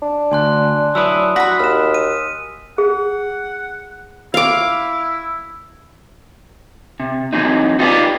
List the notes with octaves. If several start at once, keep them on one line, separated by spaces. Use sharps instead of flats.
D4
D2 G#5 C6 F#6
F#3 E4 B4 D#6 E6
F#4 F#5 B5 B6
D#2 F6 E7
D#7
G#4 F#5
E4 F5 D6
C3
E3 F#3 C4 D#4
D#4 F4 G4 G#4 B4 D5